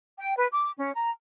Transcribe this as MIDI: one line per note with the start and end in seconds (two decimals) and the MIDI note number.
0.19 0.36 79
0.36 0.47 71
0.52 0.70 86
0.78 0.92 61
0.96 1.10 82